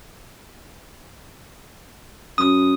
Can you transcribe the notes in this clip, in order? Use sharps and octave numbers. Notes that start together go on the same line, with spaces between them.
F#2 D#6